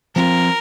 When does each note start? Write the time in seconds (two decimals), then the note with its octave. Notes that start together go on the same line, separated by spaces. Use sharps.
0.15 F3 C4 F4 A#4